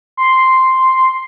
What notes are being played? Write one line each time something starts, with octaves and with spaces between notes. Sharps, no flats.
C6